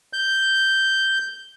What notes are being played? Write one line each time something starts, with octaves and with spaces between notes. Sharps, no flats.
G6